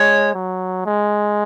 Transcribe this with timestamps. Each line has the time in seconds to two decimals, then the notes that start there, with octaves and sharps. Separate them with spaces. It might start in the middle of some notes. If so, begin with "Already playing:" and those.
Already playing: G#3 C#5
0.34 F#3
0.86 G#3